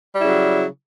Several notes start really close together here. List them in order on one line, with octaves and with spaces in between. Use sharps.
G3 E4 C#3 F#3